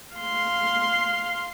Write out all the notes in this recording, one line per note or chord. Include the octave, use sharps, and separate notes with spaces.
F5 C6